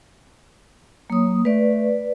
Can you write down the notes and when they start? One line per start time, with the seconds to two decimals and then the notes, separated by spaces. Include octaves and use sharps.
1.10 F#3 A#3 D#6
1.45 A3 B4 D5